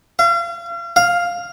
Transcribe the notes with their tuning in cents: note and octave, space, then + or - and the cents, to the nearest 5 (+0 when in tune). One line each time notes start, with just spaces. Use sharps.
F5 -40
F5 +0